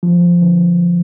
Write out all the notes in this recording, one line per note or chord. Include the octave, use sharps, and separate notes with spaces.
F3
D3